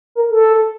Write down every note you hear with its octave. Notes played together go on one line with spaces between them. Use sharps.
A#4
A4